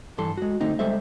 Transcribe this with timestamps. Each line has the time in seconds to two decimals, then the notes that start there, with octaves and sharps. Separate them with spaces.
0.18 G2 E3 A4 C6
0.37 G#3 F#4
0.61 D3 A3 C4 D#4
0.79 G3 G#3 A4 C5 E5